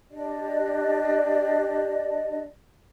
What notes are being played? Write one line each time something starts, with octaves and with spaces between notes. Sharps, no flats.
D4 G4 D5 D#5